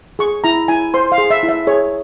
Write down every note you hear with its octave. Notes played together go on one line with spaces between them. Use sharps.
G#4 C#6
E4 A#5
E4 G#5
C5 C6
F5
G#4
E5
E4
E5
G#4 C#5